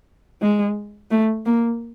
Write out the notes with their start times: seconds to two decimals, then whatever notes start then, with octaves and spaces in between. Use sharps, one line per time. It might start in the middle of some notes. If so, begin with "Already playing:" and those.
0.42 G#3
1.11 A3
1.46 A#3